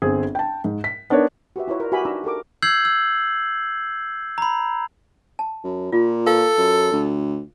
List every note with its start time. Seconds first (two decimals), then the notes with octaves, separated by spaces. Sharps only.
0.02 G1 C4 G#4
0.35 G5 A5
0.64 G#2
0.84 B6
1.10 B3 D4 D#4 A#4 C#5
1.56 F#4 G4 B4 E5
1.68 E4 F4 B4 C#5 A#5
1.80 A#4 D5
1.92 F#4 G4 B4 E5 G#5 B5
2.05 D4 D#4 A#5 D6 E6
2.24 G4 A4 A#4 D6
2.62 E6 G6 G#6 C7 F#7
2.85 E6
4.38 A#5 B5
5.39 A5
5.64 F#2
5.92 A#2 F4
6.27 A4 B4 F5
6.57 F#2
6.92 D2